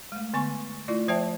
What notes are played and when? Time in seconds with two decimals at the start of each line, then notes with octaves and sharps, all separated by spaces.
0.12 G#3 A3
0.33 D3 B3 G#5 C#6
0.88 A3 E4 F4 D5
1.08 F3 C5 E5 G5 A5